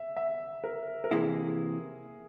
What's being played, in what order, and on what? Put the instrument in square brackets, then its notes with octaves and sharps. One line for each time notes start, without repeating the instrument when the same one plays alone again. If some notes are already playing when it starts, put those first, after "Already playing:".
Already playing: [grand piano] E5
E5
A#4
A#4
[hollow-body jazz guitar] C3 E3 A#3 E4 [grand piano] G#4